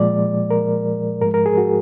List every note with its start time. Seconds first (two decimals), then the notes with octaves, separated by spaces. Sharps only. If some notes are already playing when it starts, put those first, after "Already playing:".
Already playing: A#2 F3 G#3 D5
0.51 A#4
1.21 G#2 F3 G#3 A#4
1.34 A#4
1.46 G#4
1.57 F#4